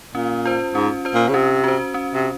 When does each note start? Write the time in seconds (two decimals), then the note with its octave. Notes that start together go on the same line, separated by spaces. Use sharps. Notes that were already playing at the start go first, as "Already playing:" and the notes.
0.15 A#2 C#4
0.45 F4 C5
0.75 G#2 C#4
1.05 F4 C5
1.14 A#2
1.29 C#3
1.34 C3 C#4
1.64 F#4 C5
1.94 C#4
2.14 C3